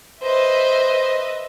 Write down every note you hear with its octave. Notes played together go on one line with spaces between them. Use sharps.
B4 C5 D#5 E5